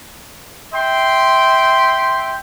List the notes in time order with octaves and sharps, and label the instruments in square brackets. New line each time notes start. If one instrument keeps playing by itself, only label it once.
[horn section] E5 G5 C6